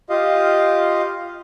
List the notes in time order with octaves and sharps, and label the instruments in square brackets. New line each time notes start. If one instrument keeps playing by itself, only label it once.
[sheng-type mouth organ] F4 G4 D#5 F5